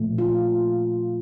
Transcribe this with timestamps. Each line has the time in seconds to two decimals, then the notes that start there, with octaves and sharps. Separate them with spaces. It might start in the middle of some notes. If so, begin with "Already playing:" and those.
Already playing: A#2 F3 A3
0.18 F4